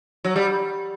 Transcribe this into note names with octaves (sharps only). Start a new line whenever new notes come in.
F#3
G3